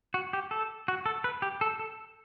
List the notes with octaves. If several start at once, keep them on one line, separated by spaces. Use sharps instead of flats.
F#4
G4
A4
F#4
A4
B4
G4
A4
A4